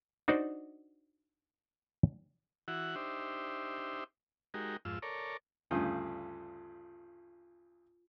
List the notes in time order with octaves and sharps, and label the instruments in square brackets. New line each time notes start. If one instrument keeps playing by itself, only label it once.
[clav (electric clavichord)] D4 D#4 F#4 C5 D5
[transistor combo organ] E3 E4 F#4 F#5
D4 D#4 G4 C5 E5
G#3 D#4 F#4 G4 A#4
F2 G#2 F4 E6
A4 A#4 C#5 D5
[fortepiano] D2 G2 C#3 [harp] F4 D#6 G6